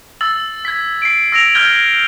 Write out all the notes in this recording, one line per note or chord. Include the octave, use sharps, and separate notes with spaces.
E6 A6 F#7
G#6 B6
C7 D7
E6 A#6 D7 F7
F6 G6 G#6 G7